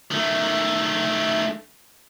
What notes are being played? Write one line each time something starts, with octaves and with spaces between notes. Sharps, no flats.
D#3 A3